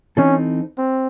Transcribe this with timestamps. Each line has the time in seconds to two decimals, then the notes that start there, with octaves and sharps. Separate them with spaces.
0.17 E3 C4 C#4 D#4 A4
0.78 C4